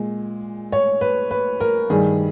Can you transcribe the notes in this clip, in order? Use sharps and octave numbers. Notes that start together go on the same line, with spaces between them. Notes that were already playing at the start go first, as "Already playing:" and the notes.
Already playing: A#2 G#3
C#5
B4
B4
A#4
G2 D#3 G3 G#4